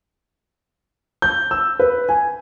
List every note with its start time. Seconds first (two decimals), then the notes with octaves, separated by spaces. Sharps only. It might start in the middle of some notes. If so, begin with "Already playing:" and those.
1.22 G6
1.51 E6
1.79 B4
2.09 G#5